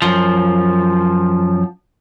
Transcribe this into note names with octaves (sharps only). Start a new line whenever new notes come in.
F#2 F3